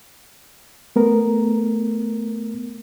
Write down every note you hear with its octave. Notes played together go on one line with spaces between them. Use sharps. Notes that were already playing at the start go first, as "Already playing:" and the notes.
A3 B3 A#4